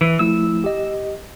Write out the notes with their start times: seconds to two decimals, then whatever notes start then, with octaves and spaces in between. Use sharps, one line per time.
0.01 E3
0.19 F3 A3 E4 E6
0.64 G4 D#5